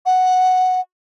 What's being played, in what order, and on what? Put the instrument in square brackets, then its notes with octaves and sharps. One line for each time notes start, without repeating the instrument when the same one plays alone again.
[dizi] F#5